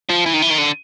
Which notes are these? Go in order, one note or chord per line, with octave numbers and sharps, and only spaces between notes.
F3
E3
D#3
E3
D#3
D3